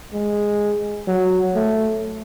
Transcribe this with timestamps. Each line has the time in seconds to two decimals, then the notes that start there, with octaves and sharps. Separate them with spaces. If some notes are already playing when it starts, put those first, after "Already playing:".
0.13 G#3
1.07 F#3
1.55 A3